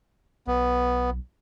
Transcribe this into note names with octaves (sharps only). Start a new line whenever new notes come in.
B1 B3